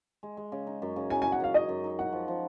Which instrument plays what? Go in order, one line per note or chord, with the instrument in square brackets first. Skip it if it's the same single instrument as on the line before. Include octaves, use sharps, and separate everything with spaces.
[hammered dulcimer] G#3
G#3
C#3
D#4
F#2
C#3
[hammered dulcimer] F#2 [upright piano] G#5
[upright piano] G#5
[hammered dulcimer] C#3
[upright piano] F#5
[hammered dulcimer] F#2 [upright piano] F5
[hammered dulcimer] D#4 [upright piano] D#5
[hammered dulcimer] F#2
D#4
[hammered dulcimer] F#4 [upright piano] F#5
[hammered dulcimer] F3
F3